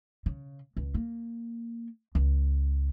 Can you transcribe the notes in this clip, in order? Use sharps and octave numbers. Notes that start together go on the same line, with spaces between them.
C#3
C#2
A#3
C#2